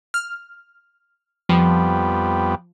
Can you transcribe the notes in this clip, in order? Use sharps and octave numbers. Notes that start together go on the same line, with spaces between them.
F6
F2 F3 G3 B3